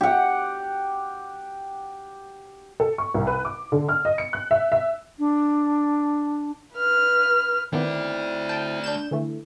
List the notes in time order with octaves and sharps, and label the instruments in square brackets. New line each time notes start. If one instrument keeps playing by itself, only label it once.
[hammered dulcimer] G4 F#5
[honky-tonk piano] A4
C#6
C2
B4
D6
D3
F6
D#5
C#7
F#6
E5
E5
[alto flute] D4
[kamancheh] B4 F6
[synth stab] D#3 B3 [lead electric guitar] A3 D5 [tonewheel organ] C4 E4
[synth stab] G5 A5 G6
D4 G6 E7
D3 E3 A3